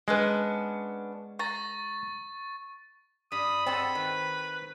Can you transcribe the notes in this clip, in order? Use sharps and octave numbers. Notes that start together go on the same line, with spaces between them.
G#3 B3 C#4 D4
A#5 C#6 A6
G2 B5 D#6
C4 G#4 A4 D#5 F#5
D#3 B4